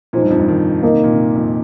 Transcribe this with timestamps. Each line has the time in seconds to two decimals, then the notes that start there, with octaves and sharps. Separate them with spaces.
0.13 A#2 F3 D#4 C5
0.22 G2
0.30 F2
0.39 G2
0.48 D#3
0.82 D#3 A#3 D#4 A#4 D#5
0.93 C3
1.04 A#2
1.14 C3
1.35 F2